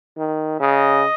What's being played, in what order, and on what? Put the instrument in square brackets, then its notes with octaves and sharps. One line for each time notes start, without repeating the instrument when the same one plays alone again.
[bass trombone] D#3
[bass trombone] C#3 [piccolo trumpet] D#5